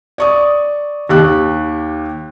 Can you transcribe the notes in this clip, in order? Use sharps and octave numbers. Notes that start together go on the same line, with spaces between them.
D5 C#6 D#6
D#2 G4 F#6